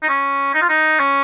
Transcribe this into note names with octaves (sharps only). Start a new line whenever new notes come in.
D#4
C#4
D#4
F4
D#4
C#4